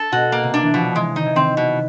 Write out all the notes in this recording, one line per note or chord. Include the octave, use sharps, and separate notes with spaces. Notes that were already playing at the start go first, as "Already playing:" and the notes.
Already playing: A4
B2 F#4
A#3
C3
D4
E3
B2 F3
E3 G#3
D#3 D#4
E3
D#3 C4
B2